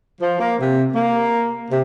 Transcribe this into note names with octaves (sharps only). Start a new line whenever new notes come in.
F3
A#3
C3
A#3
C3